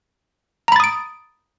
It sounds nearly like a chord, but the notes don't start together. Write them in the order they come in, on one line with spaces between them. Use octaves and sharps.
A#5 B5 A6 D#6 D7